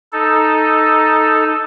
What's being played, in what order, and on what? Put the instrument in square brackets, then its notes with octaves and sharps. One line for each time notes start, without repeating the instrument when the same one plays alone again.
[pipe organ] D#4 A4